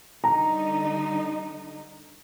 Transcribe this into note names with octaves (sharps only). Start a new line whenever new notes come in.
D3 G3 D#4 A#5